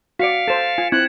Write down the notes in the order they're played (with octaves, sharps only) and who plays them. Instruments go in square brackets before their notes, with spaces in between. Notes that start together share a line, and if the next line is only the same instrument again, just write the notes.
[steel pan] F#4 D5 [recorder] F5 [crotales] B6 C#7 D7
[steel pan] A4 C5 [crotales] A6 E7
[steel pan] F4 G#5
[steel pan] C4 E4 [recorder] F#6 [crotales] G#6